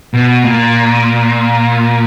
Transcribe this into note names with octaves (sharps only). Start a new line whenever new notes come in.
B2
A#2